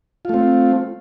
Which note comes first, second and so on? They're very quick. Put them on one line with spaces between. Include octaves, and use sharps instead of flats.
F4 A3 C4